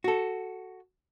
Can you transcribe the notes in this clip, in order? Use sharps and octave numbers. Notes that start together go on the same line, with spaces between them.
F#4 A4